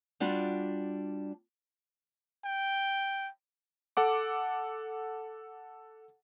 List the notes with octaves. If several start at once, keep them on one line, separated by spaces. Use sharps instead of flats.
G3 D4 F4 F#4
G5
A4 F#5 D6